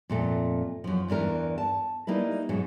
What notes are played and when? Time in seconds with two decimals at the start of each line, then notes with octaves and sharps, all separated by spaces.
0.10 F2 A#2 A3 C4
0.84 F#2 F3
1.08 E2 G2 E3 A#4
1.58 A5
2.07 G3 A#3 D#4 E4 B4
2.49 G#2 B2 F#3 G#3